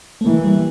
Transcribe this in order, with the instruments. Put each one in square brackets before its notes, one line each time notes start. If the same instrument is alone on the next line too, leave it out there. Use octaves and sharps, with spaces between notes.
[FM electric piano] A3
[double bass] E3 [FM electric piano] A#3
[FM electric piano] G3